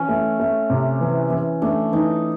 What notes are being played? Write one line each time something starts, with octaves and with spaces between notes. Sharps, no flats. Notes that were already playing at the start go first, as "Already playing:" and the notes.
Already playing: E3 C#4
A3
A3
C3
E3
E3
A3 D4
E3 D#4